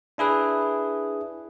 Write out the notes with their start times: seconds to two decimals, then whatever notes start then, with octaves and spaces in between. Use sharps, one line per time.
0.18 D4 E4 G#4 B4